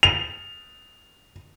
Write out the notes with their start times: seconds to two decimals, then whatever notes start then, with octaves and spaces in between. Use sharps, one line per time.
0.03 F7